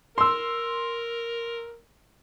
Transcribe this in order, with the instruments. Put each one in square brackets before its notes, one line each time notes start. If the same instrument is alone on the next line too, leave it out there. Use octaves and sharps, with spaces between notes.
[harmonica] A#4 [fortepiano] C6 E6